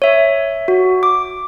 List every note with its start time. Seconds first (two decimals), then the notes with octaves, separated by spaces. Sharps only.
0.02 C#5 E5
0.68 F#4
1.03 D6